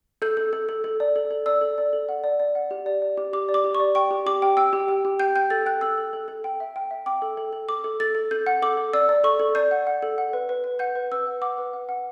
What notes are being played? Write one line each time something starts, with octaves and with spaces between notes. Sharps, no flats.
A4 G6
A4
A4
A4
A4
D5
A4
A4
D5 E6
A4
D5
A4
F#5
D5
D5
F#5
G4
D5
D5
G4
G4 D6
D5
D6
G4
C#6
D5
G5 C#6
G4
G4 D6
G5
G5 E6
G4
G5
G4
G5 G6
G5 G6
A4 A6
G5 F#6
A4 E6
A4
A4
A4
G5
E5
G5
E5
G5 D6
A4
A4
A4
A4 D6
A4
A4 A6
A4
A4 G6
F#5
A4 D6
A4
D5 E6
D5
A4 C#6
A4
D5 G6
F#5
F#5
A4
F#5
B4
B4
B4
F#5 G6
B4
B4 E6
F#5
F#5 D6
B4
F#5
F#5